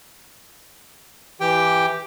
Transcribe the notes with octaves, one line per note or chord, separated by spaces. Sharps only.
E3 G4 G5